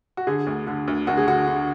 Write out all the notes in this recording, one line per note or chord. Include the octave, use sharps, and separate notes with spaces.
F#4
D3 G#4
D2
D3
D2
D2 F#4
G#4
D3 F#4
D3